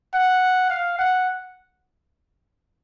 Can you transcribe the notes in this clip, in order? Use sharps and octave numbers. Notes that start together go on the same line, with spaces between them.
F#5
F5
F#5